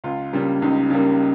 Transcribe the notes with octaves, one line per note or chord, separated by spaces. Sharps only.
C#2 F4
C#3 G3 A#3
C#2 D#4
C#3 G3 A#3